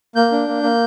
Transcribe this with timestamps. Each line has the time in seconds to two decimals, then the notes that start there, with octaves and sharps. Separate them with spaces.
0.15 A#3 G6
0.32 D4
0.48 A#3
0.63 A#3